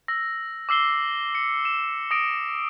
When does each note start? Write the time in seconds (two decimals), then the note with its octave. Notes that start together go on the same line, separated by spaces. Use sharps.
0.08 E6 A#6
0.69 D6 E6 C7 G7
1.35 C#7
1.65 E7
2.11 D#6 A#6 D7